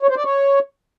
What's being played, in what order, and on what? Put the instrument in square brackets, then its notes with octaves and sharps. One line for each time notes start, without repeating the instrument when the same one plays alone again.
[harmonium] C#5
C5
D5
C#5